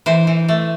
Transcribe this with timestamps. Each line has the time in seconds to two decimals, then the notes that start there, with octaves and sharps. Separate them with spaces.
0.06 E3 C5
0.27 E3
0.49 A3